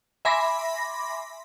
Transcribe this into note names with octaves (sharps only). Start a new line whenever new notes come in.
E5 G#5 B5 C6 D6 A#6